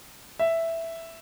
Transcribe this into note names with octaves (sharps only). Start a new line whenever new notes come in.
E5